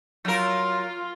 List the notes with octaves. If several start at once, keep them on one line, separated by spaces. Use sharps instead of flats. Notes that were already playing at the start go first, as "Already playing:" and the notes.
F#3 F4 A#4